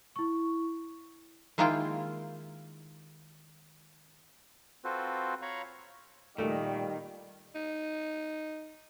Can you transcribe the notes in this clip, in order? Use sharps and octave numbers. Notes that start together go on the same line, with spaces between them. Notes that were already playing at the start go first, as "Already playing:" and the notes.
E4 C#6
D#3 G#3 A#3 E4 F4 G5
C4 F4 F#4 A4 B4 C5
C#5 F5 A#5 B5 C#6
A#2 D#3 G3 A3
D#4